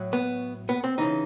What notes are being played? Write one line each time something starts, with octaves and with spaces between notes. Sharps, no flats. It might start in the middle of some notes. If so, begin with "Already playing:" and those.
Already playing: A2 F#3
B3
B3
C4
C#3 E3 D#4